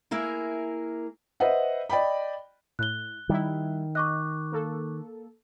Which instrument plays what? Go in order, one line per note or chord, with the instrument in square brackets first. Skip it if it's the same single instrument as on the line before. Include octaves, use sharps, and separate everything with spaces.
[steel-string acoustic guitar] A#3 E4 G#4 A#4
[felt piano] B4 C5 D#5 E5 F#5
D5 D#5 G5 B5
[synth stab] A2 [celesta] F#6 G7
[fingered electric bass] D#3 [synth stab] G3 E4
[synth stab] D#5 [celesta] C#6 D6 F#6
[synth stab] A#3 A4